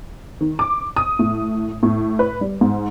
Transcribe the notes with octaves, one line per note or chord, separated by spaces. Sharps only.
D#3
D6
D#6
A2
A2
B4
G3
G#2